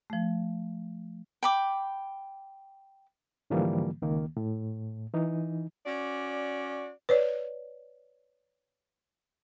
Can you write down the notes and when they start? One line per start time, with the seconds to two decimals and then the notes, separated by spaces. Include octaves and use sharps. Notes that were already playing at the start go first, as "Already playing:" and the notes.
0.10 F3 A3
1.43 G5 B5 D6
3.50 G#2 D3 E3 F3 G3 A#3
4.02 C#2 D#3 A#3
4.37 A2
5.13 E3 D#4
5.86 C#4 F#4 D5
7.09 B4 C#5 D5